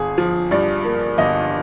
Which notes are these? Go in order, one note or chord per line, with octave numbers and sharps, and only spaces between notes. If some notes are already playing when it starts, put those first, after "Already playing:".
Already playing: G1 G#4
F3
G2 D5
A#3
G1 D#5